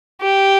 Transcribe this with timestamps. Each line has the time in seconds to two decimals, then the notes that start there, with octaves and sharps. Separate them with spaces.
0.22 G4